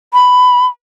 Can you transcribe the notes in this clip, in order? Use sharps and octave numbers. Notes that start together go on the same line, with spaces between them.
B5